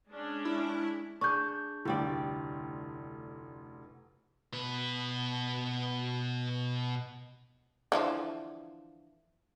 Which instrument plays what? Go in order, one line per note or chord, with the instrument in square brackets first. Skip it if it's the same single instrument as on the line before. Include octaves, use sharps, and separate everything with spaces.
[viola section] G#3 C#4 D4
[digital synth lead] E4
[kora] D4 G#4 [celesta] C#6 G6
[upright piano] F1 D2 [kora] A2 G3 D5
[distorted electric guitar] B2 B4
[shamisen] D3 E3 F3